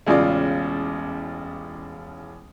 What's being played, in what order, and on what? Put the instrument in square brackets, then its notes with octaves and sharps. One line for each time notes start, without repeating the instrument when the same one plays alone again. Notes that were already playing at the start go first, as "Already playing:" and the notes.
[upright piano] E1 A1 C#3 F4 D5